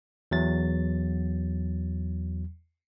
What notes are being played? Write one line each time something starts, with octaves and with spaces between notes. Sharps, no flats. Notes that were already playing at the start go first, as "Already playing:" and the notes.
E2 F#3 A6